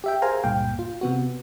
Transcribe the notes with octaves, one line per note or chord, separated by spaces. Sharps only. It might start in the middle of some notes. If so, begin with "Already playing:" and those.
G4 E5 G5
G#4 A#4 C5 F5 G#5 A#5
C#2 G2 A#2 F5 G5
F4
C3 B3 F#4